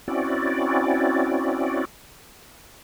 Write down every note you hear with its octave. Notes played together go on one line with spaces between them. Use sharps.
C4 C#4 E4 F#4 D5